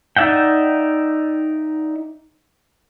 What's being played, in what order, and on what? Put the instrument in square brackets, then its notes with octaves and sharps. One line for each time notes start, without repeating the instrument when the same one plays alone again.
[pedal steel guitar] D#4 D5 E5 F#5 G5